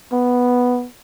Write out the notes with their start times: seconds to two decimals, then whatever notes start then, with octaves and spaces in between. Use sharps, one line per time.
0.12 B3